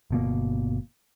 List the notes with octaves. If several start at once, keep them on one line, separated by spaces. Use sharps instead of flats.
G1 B2 A#3